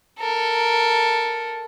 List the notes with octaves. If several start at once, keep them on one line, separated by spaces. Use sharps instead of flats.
A4 A#4